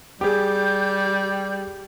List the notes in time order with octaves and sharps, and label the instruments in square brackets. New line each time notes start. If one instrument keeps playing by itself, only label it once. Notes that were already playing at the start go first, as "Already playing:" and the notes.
[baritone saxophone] G3 [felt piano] G4 G#4 [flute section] G6